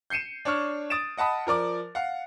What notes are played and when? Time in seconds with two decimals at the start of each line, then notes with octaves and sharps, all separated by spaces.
0.10 G6 C7 C#7 D#7 E7
0.45 D4 C#5 C#6 F6
0.90 D#6 A6 D7 E7
1.17 D#5 F#5 A5 B5 D#6
1.47 F3 A#4 D5 D6
1.95 F5 F#5